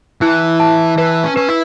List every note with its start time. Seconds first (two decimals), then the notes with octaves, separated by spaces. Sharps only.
0.21 E3 E4
0.60 A5
0.97 E3 B4
1.23 C#4
1.36 C#4 B4
1.48 E4